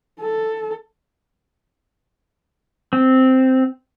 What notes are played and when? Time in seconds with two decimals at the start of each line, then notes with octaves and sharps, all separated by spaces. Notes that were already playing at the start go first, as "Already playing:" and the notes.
0.21 A4
2.93 C4